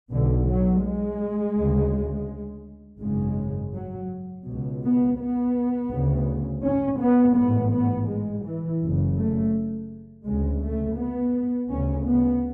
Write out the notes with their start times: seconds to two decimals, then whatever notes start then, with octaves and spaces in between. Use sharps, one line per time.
0.12 B1 B2 D3
0.48 F#3
0.84 G#3
1.56 D2 C#3
3.01 G#1 F#2 C#3 G#3
3.74 F#3
4.46 C#2 B2
4.82 B3
5.19 B3
5.90 D2 C#3
6.63 C#4
6.99 B3
7.36 A1 G#2 B3
7.72 B3
8.08 G#3
8.44 E3
8.80 F#1 F#2 C#3
9.17 A3
10.25 D2 C#3 G#3
10.62 A3
10.98 B3
11.70 D2 C#3 C#4
12.07 B3